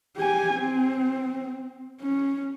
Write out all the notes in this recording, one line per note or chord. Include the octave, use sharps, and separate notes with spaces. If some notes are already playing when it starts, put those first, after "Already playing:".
G4 G#5
C4
C#4